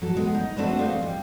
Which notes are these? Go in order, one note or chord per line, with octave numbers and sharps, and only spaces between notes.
F#3 A4
G#3 B3
D#4
A3 C4 D4 F#4 A4 B4
E3 D4 D#4 C5 F5
G3